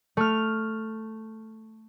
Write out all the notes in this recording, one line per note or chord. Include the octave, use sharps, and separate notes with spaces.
A3 F6